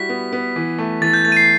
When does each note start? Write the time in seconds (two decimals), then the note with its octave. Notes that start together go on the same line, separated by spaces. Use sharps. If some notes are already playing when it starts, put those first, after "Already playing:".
Already playing: G3 E4 F#4 B6
0.09 B3
0.33 B3
0.56 E3
0.78 A3
1.02 E3 A6
1.13 G6
1.25 A3 A6
1.32 D#7
1.37 C7